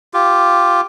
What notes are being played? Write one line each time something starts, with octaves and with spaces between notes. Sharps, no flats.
F4 G4